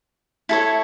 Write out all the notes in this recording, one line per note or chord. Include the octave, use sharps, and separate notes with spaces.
E4 A4 C#5 A5